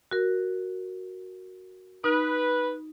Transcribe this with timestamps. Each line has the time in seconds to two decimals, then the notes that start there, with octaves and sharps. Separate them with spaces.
0.11 F#4 A#4
2.04 D#4 B4